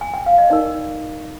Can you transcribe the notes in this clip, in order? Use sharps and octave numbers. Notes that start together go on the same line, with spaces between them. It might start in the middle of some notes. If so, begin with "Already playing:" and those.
G#5
G5
F5
D#5
D#4 A#4 D5